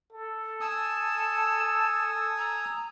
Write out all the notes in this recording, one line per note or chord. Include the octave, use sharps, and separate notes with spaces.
A4
G#5 A5 D#6 E6
A#5